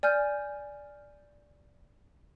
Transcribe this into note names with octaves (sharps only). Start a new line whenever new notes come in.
D5 G#5 F6 G6